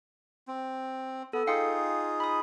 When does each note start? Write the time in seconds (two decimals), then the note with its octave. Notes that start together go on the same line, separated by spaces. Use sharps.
0.48 C4
1.33 B3 A4
1.47 D#4 F4 G#4 F5 G5 C#7
2.20 B5 D#6